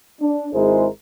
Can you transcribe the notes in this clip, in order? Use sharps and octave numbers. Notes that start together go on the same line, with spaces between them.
D4
G#1 G#3 E4 G#4 A#4 C5